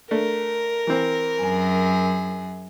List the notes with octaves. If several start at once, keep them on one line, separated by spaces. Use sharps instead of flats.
A3 D4 A#4
E3 C4
F#2 G#4